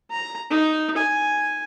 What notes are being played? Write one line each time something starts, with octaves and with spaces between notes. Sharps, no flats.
A#5
D#4
G#5